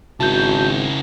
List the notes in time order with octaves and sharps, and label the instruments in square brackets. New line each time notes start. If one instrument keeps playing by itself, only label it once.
[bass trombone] G#1 [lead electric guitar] C#3 E4 [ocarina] F#4 [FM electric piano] A5 G6